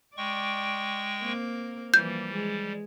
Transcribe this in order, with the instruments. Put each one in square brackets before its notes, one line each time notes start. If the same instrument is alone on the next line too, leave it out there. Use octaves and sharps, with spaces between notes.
[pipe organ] G#3 G5 C#6 [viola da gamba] D5
[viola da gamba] A#3 C4 A#4
[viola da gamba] E3 F3 A#3 [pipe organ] G3 [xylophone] G6
[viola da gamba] G#3